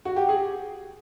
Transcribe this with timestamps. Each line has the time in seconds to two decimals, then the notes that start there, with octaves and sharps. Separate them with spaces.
0.05 F#4
0.16 G4
0.29 G#4